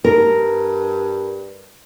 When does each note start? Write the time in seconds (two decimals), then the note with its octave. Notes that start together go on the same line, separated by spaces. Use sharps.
0.05 G2 A#4